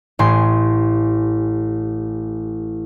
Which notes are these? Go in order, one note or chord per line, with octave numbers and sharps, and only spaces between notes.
A1 A2 G4 G#5 C6